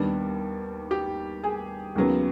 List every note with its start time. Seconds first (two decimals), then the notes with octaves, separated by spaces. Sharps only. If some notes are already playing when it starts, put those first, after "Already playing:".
Already playing: D#2 D#3 G3 B3 D4
0.91 G4
1.43 G#4
1.95 D#2 C#3 F#3 B3